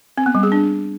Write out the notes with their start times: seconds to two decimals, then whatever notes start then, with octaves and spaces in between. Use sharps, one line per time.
0.18 C4
0.26 B3
0.35 G3
0.43 G#4
0.52 D4